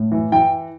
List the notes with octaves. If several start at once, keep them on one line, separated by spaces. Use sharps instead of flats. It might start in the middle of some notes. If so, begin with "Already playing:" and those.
Already playing: A2
E3
E3 G5